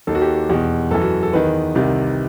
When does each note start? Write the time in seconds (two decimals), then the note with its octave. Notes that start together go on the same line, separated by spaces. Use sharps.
0.07 D#2 D#3 A4
0.15 F#4
0.22 G4
0.49 E2 B2 G4
0.91 F#2 E3 A4
1.02 F#4
1.23 A4
1.33 E2 D#3 B4
1.75 C2 C3 D#3